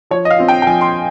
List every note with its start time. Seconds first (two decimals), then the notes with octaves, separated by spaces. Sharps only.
0.11 F3 C#5
0.25 D#5
0.30 F5
0.39 C4 F4
0.48 G5
0.62 G5
0.67 F3 G#5
0.81 C6